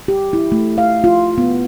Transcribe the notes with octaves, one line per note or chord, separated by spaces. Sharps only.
G4
E4
A3
F5
F4
B3